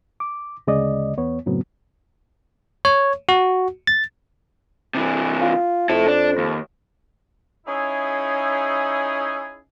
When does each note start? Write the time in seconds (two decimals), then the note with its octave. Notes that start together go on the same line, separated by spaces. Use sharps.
0.20 D6
0.67 D2 C#3 G#3 D5 D#5
1.18 E2 B3 C#5
1.46 F#2 A2 C#3 F#3 B3 C4
2.85 C#5
3.29 F#4
3.87 A6
4.95 C3 E3
5.41 F4
5.89 F2 E4 A4
6.08 D4
6.38 D#2
7.67 C#4 D#4 E4 G#4